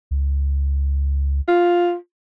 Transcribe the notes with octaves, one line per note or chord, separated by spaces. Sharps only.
C#2
F4